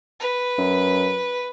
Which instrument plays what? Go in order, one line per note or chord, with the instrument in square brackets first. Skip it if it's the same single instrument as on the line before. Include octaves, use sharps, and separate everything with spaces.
[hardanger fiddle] B4
[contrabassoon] F#2